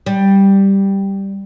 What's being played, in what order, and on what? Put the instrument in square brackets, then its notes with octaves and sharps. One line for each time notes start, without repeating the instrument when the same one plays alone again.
[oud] G3